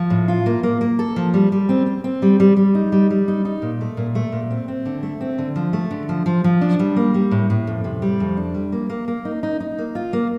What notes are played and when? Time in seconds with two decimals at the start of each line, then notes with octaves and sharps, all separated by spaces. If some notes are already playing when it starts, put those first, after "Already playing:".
Already playing: F3
0.10 A2
0.28 F4
0.46 A#3
0.63 A#3
0.81 A#3
0.99 A4
1.16 F3
1.34 G3
1.52 G3
1.69 C4
1.86 C4
2.04 C4
2.22 G3
2.40 G3
2.57 G3
2.75 D#4
2.92 G3
3.10 G3
3.28 D#4
3.45 D#4
3.62 A#2
3.81 A3
3.97 A#2
4.15 A3
4.32 A#2
4.51 C4
4.68 C4
4.85 D3
5.03 A3
5.21 C4
5.38 D3
5.56 F3
5.73 A3
5.91 D3
6.09 F3
6.26 F3
6.44 F3
6.61 D4
6.79 G3
6.96 A#3
7.14 G3
7.31 A2
7.50 A2
7.67 F2
7.84 C3
8.02 G3
8.20 F2
8.37 D4
8.55 G3
8.72 A#3
8.90 A#3
9.08 A#3
9.25 D#4
9.43 D#4
9.60 D#4
9.78 A#3
9.95 F4
10.13 A#3